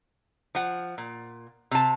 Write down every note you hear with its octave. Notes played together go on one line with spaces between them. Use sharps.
F3 F#5
A#2
C3 A5